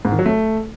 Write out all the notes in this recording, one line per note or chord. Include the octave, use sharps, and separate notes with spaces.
G#2
D#3
F#3
A3